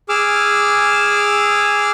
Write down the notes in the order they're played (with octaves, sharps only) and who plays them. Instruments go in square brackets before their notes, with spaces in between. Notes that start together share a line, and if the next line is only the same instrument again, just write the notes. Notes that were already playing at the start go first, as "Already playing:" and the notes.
[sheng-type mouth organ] G#4 D6 E6 F6